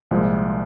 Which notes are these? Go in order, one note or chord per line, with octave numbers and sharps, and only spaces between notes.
C2 A#2 F3 G#3